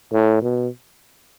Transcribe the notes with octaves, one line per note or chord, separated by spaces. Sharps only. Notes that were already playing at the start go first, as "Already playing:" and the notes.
A2
B2